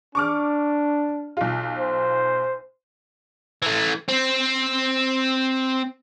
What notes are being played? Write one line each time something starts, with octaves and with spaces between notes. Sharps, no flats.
D4 C#6 D6 F6
B1 F4
C5
E3 A3
C4